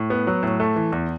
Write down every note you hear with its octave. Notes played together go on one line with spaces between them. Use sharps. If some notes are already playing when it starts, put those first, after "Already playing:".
Already playing: A2
B3
F#3
A2
A3
E3
E2